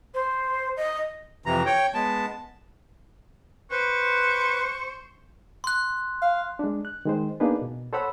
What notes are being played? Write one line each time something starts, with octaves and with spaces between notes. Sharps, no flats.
C5
D#5
F2 C3 E3 A#5
C#5 G5
G#3 B3 A5
B4 C5 C#6
C6 F#6
F5
G#3 D4
F#6
D#3 G#3 C5
A#3 B3 D4 D#4 G#4 B4
B2
A4 C5 C#5 F#5 B5 E6